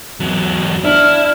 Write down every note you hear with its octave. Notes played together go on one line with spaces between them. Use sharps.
E2 F#3
D4 E4 F6